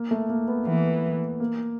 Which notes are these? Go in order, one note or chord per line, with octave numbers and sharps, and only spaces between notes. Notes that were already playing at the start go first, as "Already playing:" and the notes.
Already playing: A#3
A3
A#3
B3
E3 B3
A#3